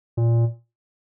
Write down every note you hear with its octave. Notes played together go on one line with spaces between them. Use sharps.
A#2